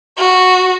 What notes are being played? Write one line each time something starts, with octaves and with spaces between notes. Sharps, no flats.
F#4